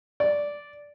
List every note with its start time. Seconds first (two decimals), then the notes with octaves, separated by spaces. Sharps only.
0.20 D5